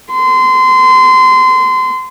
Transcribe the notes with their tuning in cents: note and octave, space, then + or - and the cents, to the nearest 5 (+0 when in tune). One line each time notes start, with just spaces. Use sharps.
C6 -25